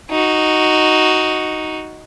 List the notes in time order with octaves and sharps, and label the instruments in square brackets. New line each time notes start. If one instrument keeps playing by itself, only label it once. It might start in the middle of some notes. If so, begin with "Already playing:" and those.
[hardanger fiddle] D#4 F#4